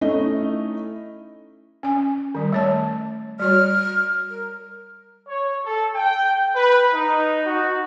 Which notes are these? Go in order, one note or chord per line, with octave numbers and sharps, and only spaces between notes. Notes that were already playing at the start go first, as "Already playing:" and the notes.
A3 C#4 D#4 E4 D#5
C#4 G#5
D#3 G3
A3 C#5 A5
G3 F#4 C#5 F6
A#4
C#5
A4
G5
B4
D#4
F#4